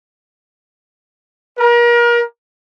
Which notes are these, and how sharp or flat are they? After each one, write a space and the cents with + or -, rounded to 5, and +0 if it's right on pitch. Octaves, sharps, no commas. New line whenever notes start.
A#4 +35